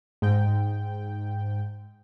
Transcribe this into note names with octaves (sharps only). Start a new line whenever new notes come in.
G#2 G5